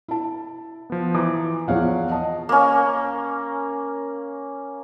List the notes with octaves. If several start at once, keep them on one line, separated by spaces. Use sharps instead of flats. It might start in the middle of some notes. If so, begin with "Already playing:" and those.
E4 A5
F3 B3
E3 A#5 D6
E2 F3 C#5 F5 F#5
D#5 A5
A#3 C#4